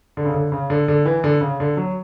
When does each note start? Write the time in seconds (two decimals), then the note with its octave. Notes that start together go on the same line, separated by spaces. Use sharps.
0.17 D3
0.25 C#3
0.34 D3
0.52 C#3
0.70 D3
0.88 D3
1.06 E3
1.24 D3
1.41 C#3
1.60 D3
1.77 F#3